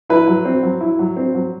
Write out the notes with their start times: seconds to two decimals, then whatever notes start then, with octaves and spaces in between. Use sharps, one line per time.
0.10 E4 B4
0.27 F#3
0.45 C4
0.63 F#3
0.81 E4
0.99 F#3
1.17 C4
1.35 F#3